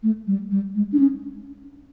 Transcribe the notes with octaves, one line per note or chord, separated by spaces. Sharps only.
A3
G3
G3
G#3
D4
C#4